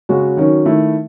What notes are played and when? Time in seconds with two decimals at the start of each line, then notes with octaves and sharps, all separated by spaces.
0.09 C#3 G#3 C#4 F#4
0.37 D#3 F#3 C#4
0.66 D#3 A3 E4